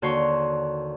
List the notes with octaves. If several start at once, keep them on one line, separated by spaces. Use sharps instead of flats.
D#2 D3 F#4 C#5 C6